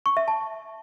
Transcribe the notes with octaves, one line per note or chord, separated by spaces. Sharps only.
C#6
E5
A5